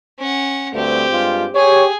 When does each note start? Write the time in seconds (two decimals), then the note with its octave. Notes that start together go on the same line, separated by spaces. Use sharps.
0.19 C#4 F#5
0.74 D2 G2 A3 C4 G4
1.12 G2 G#3 F4
1.55 G4 G#4 C#5